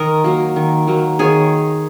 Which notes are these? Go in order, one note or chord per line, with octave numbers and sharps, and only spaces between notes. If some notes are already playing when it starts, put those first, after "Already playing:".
Already playing: D#3 A#4 D#5
F#3 A#3
D#3
F#3 A#3
D#3 G#4 C#5